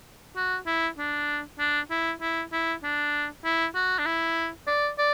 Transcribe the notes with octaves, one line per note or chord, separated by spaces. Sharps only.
F#4
E4
D4
D4
E4
E4
E4
D4
E4
F#4
D4
E4
D5
D5